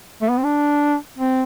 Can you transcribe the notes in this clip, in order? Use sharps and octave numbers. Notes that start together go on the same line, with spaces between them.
A3
B3
C4
D4
C4